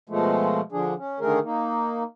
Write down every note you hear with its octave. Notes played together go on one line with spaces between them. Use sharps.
B2 F3 G#3 A3
D3 F3 D4 G#4
C#4
D3 D#3 A3 G#4 A#4
A#3 D#4